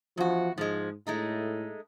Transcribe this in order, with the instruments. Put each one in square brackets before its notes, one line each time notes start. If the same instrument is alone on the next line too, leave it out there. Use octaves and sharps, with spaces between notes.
[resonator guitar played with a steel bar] E2 F#4 [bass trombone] F3
[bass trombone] G#2 [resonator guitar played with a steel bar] F3 G#3
[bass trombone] A2 [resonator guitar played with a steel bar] G#3 A3 D#4